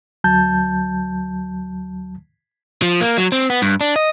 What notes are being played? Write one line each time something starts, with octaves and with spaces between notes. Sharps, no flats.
D2 F#3 A5 G6
F3
A#3
F#3
C4
B3
G2
D4
D#5